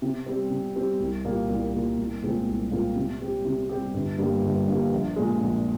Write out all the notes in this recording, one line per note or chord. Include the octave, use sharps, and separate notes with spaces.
C3
G3 C4
C3
G3 C4
C2
A#2 G3 A#3
C2
A#2 G3 A#3
C2
A#2 G#3 C4 F4
C2
A#2 G#3 C4 F4
C3
G3 C4 G4
C3
G3 C4 G4
G1
G2 G3 A#3
G1
G2 G3 A#3
A#1
A#2 G#3
A#1